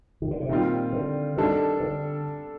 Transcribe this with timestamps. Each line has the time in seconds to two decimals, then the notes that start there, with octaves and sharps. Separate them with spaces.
0.22 D#3
0.31 D3
0.40 C3
0.49 A#2 D#3 G3 C4 F4
0.93 D3
1.37 D#3 G3 D4 A4
1.80 D3